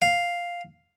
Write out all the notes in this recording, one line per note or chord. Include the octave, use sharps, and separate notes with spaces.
F5